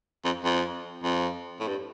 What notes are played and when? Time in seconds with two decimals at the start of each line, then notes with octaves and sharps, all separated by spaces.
0.25 F2
0.45 F2
1.04 F2
1.60 A2
1.68 G2